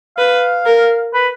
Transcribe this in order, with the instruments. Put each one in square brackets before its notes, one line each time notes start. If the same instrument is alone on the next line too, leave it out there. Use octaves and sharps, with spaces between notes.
[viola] B4 [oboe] F5
[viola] A#4
[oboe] B4